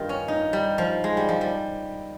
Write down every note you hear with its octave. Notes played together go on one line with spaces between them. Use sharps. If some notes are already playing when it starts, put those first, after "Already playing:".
Already playing: G2 D#3 F4 G4
C#4
D#4
G3
F3
G#3
G3
F3
G3